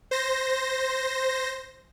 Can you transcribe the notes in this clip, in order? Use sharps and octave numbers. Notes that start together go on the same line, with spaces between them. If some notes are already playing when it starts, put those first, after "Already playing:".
C5 A#6